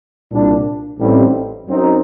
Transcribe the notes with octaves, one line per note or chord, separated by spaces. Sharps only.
C2 A#2 G3 D4
A1 A2 G3 C4 D#4
F#2 F#3 C4 D#4